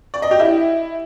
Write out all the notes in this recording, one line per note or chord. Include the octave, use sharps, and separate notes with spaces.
D5
D#5
G4
E4